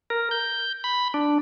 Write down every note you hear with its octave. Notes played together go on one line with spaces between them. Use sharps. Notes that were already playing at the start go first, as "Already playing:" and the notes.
A#4
G6
B5
D4